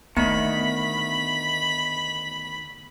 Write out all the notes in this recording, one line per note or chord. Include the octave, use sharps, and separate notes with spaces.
D2 D#3 A3 B3 B5